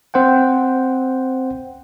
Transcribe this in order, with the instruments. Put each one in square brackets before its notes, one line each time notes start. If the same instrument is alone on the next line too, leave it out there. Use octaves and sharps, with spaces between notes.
[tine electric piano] C4 C5 F#5 G5